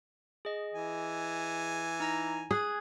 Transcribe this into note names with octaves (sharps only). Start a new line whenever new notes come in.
G#4 D#5
E3 G#5
D#4 A#5 A#6
G#4 D#6 F#6 G#6